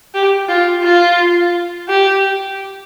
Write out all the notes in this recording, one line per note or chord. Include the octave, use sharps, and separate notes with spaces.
G4
F4
F4
G4